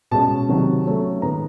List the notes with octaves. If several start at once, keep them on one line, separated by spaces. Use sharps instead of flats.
B2 G#3 C#4 A5
C3 D#3 F#3
C#3 F#3 A3 C#4
D#3 G#3 B3 A#5